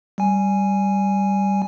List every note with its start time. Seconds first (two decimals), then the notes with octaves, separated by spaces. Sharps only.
0.18 G3 G#5